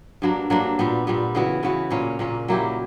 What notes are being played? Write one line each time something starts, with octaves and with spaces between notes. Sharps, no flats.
G2 F#3 A#3 D4
G2 F#3 A#3 D4
A#2 G3 B3
A#2 G3 B3
C#3 E3 B3 F#4
C#3 E3 B3 F#4
A#2 A#3 C#4
A#2 A#3 C#4
F#3 A#3 E4 G4